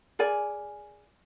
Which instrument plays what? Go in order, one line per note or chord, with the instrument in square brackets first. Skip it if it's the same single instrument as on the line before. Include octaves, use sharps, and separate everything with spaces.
[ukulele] G#4 A#4 D5 G#5